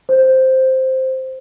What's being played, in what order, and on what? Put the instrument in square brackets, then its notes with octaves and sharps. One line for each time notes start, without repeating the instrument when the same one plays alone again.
[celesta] C5